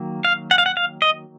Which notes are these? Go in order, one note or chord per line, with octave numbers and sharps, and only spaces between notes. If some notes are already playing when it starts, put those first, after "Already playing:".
Already playing: D#3 F#3 A#3
F5
F#5
F5
F#5
F5
D#5